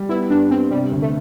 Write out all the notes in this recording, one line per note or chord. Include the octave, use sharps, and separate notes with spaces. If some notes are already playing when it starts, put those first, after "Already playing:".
Already playing: G3
B3 E4
G2 D4
G2 C4
C3 G3
D2
A3